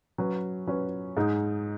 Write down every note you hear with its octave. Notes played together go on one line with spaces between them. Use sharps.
F#3 C#4 B4
F#3 C#4 B4
G#2 G#3 D#4